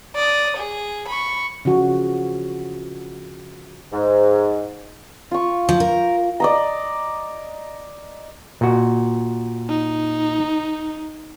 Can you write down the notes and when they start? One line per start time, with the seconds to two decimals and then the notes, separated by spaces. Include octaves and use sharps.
0.16 D5 D#6
0.57 G#4
1.08 B5 C#6
1.65 C#3 F3 F#4
3.92 G#2
5.31 F4 C#6
5.69 F3
5.80 A#4
6.40 D5 D#5 A#5
8.61 A#2 F#4
9.68 D#4